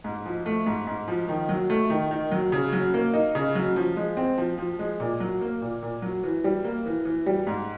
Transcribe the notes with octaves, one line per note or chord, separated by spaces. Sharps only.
G#2
F3
A3
G#2
G#2
F3
D#3
F#3
A3
D#3
D#3
F#3
C#3
F#3
A#3
D#4
C#3
F#3
F3
G#3
C4
F3
F3
G#3
A#2
F#3
A#3
A#2
A#2
F#3
E3
G3
A#3
E3
E3
G3
G#2